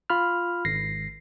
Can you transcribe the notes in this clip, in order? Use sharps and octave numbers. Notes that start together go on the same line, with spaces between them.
F4 B5 F6
G#1 A#6 C7